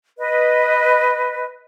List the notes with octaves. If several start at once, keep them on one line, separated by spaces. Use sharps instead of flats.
B4 D#5